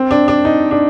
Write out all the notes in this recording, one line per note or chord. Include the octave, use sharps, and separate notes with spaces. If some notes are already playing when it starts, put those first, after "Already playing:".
Already playing: C4
D4
D4
D#4
D4